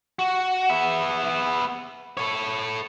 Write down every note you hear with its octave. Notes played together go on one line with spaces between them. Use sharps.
F#4
B3 E5
A4 C#5